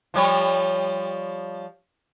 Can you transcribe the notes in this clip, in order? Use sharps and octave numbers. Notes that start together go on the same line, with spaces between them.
F3 G3 C#5